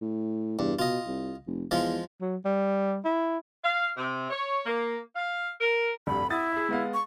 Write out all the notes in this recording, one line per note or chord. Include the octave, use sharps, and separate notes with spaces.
A2
E2 G2
B2 F4 D#5
C2
F1
E2 F3 G#3 F4
F#3
G3
E4
F5
C3
C#5
A#3
F5
A#4
F1 D2 G2 B5
E4 F#5 D#6 A6
G#4 E5
G#3 B3 F5
C#6